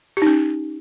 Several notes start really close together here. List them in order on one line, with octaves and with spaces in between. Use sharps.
G4 D#4 C#4